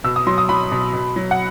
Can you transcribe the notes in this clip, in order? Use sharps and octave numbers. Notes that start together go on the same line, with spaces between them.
B2 E6
D#6
F#3 C6
D#6
F#3 B5
B2
B2
F#3
F#5